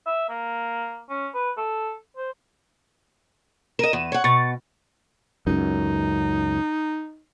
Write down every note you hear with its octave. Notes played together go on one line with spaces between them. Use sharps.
E5
A#3
C#4
B4
A4
C5
A#4 D#5 D#7 E7
E2
C#5 F#5
B2 C#6 A6
C#2 F#2 D#4